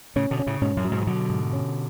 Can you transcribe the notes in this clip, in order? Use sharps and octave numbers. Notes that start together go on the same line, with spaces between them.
A2 C#3 C#4
B2 D3
C#4
A2 C#3
G#2 B2 C#4
F#2 A2
F#3
G#2 B2
E3
B2 D3 F#3
G#2
C#4